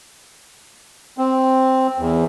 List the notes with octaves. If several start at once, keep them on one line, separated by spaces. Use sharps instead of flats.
C4
E2